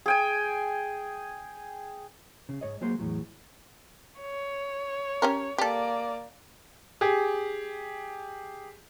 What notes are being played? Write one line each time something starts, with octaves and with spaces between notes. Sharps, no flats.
G#4 G5 G#5
C#3
G#2 C#5 D#5
F#3 G#3 A#3 F#4 C5
E2 A2 F#3
C#5
C#4 G4 A#4
A#3 G4 A4 D5
G4 G#4